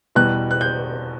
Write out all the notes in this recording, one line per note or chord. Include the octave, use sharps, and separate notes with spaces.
E2 B2 G3 F#6
F#6
G6